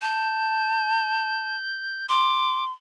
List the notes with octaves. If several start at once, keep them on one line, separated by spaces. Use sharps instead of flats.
A5 G6
C6 D6